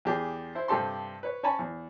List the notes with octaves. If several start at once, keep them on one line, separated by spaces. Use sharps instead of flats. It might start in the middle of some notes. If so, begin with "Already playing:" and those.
E2 G4 G#4
E4 C5
G2 C3 G4 A4 C6
B4 C#5
C#4 C#5 G#5 A5 B5
E2